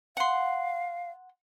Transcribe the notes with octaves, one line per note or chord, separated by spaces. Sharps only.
F5 F#5 C6